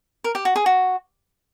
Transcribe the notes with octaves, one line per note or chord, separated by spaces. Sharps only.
A#4
G4
F#4
G#4
F#4